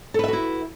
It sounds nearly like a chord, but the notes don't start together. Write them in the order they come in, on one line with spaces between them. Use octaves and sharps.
A4 B4 E5 F#4 E4